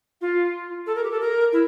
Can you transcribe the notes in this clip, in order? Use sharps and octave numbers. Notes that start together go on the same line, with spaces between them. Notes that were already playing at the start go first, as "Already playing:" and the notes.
F4
A4
A#4
G4
A4
A#4
E4